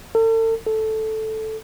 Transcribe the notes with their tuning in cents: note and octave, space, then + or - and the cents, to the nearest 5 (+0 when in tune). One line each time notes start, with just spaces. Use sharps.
A4 +40
A4 -5